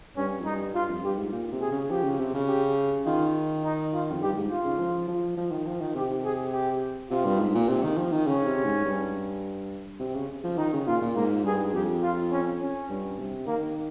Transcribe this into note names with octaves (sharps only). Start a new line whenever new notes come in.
G2 C#4
F2
G2 D#4
G2 F4
F2
G2 G4
G#2
A#2
C3
G#4
C#3
F3 G4
C#3
C3
C#3
G4
D#3 F4
D#4
F4
F2
G2 G4
G#2
F4
C#3
F3
F3
F3
D#3
F3
D#3
C3 G4
G#4
G4
C3 F4
G2
G#2
A#2
C3
D#3
F3
D#3
C#3 C#4
C3
G#2
G2
C3
C#3
F3
D#3 D#4
C#3
A#2 F4
A#2
G#2 A#3
G2 G#4
F2 G4
F4
C#4
C#4
G2
C3
D#3 A#3